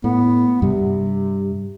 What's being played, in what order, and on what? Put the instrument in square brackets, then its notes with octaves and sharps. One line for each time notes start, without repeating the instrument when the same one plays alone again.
[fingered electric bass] A2 [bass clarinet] B3
[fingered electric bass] G2 G3 [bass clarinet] C3